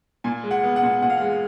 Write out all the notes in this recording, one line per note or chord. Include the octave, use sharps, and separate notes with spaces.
A#2 G#5
G#3
F#5
B3
F#5
A#2
A#2 F#5
F5
G#3 F#5